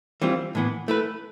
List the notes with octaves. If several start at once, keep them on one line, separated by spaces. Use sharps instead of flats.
E3 G3 C4 F4
A2 E3 B3
A3 E4 B4